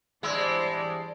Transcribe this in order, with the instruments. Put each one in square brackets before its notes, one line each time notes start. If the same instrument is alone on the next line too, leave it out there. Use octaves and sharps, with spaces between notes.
[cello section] E3 C5 D5 [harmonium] G3 D4 [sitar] G#3 [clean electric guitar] E4